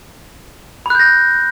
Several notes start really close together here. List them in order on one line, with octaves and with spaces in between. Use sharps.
B5 F#6 G6 A#6